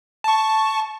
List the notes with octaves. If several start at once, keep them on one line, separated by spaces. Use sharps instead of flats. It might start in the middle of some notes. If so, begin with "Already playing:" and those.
A5 C#6